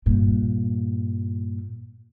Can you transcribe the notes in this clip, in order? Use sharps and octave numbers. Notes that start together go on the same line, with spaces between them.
G2 A#2